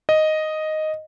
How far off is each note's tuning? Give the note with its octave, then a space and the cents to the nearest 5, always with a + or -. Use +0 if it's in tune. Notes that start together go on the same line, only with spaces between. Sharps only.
D#5 +0